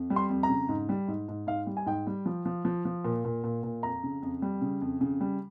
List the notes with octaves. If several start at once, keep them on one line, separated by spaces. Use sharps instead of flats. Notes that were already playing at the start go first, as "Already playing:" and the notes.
Already playing: F2
G3
C6
F2
A#5
C#3
G#2
G3
G#2
G#2
G#2 F5
G3
G#5
G#2 G5
G3
F3
F3
F3
F3
A#2
A#2
A#2
A#2
F2 A#5
C#3
F2
G3
C#3
F2
C#3
G3